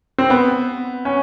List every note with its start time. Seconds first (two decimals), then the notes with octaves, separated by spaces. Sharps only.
0.18 C4
0.30 B3
1.05 C#4